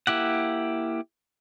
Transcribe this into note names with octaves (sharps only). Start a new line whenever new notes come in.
A#3 E4 G4 F#5